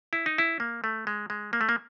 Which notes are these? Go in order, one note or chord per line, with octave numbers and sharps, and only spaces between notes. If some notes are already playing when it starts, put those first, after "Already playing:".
E4
D#4
E4
A#3
A3
G#3
G#3
A#3
A3
A#3